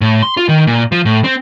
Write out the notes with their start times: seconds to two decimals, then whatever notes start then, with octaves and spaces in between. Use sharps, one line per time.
0.01 A2
0.22 C6
0.37 F4
0.49 D#3
0.67 A#2
0.92 F3
1.05 A2
1.24 C4